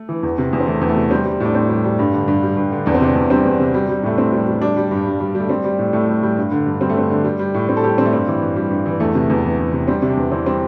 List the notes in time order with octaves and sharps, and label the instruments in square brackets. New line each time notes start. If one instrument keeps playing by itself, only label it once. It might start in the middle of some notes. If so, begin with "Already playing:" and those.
Already playing: [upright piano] A3
E3
E2
C3
E2
C4
E3 A3
E2
A3
C3
G3 C4
G3
A2 D4
A2 C4
G3
G3
G2
D3
G2
G3
G2
D3
E2 D4
C4
C3 D4
E2
G3 C4
E2
C3
G3
G3
A2 A3
A2 C4
G3
G3
G3 D4
G3
G2
G2
G3
G3 A3
G3 C4
G3
A2
A2 A3
G3
G3
G2
D3
G2
G3 C4
A3
G2 C4
D3
G3
G3
A2
A2 C4
A4
G3 G4
G3 C4
A3
G2 C4
E3
G2
G3
G2
E3
E2 A3
C3
E2
E3
E2
C3
G3 C4
C3
D4
E2
E3 C4
G3 C4